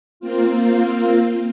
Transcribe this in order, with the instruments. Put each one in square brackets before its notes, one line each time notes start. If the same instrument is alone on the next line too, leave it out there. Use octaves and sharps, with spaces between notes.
[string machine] A#3 C4 F4